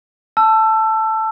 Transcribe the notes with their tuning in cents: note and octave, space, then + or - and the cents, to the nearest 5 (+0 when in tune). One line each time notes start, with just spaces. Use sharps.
A5 +0 E6 +20